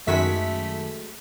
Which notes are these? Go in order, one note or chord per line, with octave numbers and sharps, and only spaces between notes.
F#2 D#3 G#3 A3 F#4 E5 B6